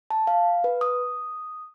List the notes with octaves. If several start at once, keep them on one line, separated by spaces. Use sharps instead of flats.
A5
F5
B4
D#6